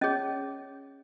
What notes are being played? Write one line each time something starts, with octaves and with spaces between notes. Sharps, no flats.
C#4 G#4 C#5 D#5